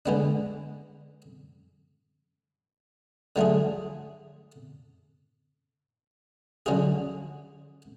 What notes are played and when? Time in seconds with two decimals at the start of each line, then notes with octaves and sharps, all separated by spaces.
0.06 D3 G#3 B3 D4
3.36 D3 F#3 A3 F4 G#4
6.66 D3 F#3 C#4 F4 G#4